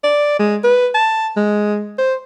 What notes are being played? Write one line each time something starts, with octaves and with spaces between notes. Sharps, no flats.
D5
G#3
B4
A5
G#3
C5